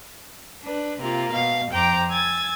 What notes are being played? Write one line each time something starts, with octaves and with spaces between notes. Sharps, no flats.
D4 B4
C3 A#3 F4
B2 F5
F2 C5 G5 A#5 D6
G#5 E6 G#6 A6